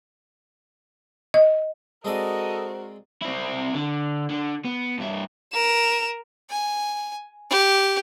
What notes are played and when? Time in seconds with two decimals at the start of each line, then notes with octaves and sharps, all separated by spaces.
1.34 D#5
2.05 G#3 C4 F#4 A4 A#4 C5 D5 D#5
3.22 C4 E4
3.74 D3
4.30 D3
4.65 B3
4.98 G2 E5
5.53 A#4 E7
6.50 G#5
7.50 G4